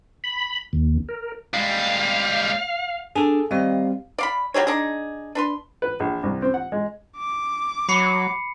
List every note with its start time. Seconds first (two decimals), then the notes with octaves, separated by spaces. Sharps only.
0.24 B5
0.73 D#2
1.09 A#4
1.54 G3 G#3 F5
3.16 D4 G#4 A4 G#5
3.51 D#3 G3 C4 D#5 F5
4.18 D5 F5 B5
4.54 F#3 G3 G#4 C#5
4.67 D4 D#4 G#4
5.35 D4 B4 C6
5.82 B4
6.00 A#1
6.23 C2
6.42 C4
6.54 F#5
6.72 G#3
7.17 D6
7.89 F#3 B5 C7 C#7